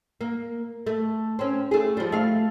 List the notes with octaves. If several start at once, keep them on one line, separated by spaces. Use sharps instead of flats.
A#3
A3
C4 C#4
A3 G#4
F3 G3
A3 F5